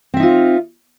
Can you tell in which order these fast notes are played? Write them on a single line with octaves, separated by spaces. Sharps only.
C4 E5 D#4 F4